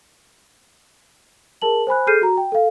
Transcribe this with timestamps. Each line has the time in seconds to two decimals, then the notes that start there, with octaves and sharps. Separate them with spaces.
1.62 G#4 A#4 A5 F#7
1.87 C5 G#5 B5 F#6
2.07 G#4 A4 F6 G6 C7 D#7
2.21 F#4 A#5
2.37 G5
2.52 A4 F5